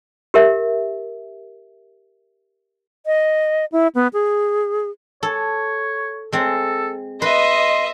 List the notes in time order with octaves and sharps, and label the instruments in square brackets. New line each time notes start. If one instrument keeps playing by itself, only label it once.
[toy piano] G4 A#4 E5
[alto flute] D#5
E4
B3
G#4
[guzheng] A4 [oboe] C#5
[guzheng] G#3 C4 [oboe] A4
[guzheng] B4 [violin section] D#5 [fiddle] E5 [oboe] C6